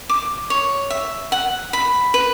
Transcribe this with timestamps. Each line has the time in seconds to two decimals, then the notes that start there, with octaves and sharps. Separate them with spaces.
0.09 D6
0.50 C#5
0.90 E5
1.32 F#5
1.73 B5
2.14 B4